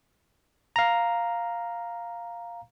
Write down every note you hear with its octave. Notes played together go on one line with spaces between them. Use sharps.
F5 A#5